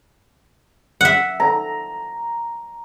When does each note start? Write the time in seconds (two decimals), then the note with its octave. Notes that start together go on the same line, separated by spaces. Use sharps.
1.01 E5 F#5
1.40 A#5